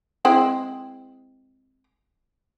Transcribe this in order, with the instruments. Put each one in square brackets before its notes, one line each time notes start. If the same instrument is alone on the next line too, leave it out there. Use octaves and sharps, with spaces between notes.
[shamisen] G#3 C4 E4